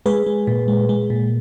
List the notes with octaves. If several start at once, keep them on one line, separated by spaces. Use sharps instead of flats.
G#3 G#4 B4
G#3
A#2
G#3
G#3
A#2